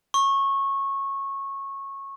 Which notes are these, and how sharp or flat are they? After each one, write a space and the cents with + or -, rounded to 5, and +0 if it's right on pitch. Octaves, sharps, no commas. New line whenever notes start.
C#6 -20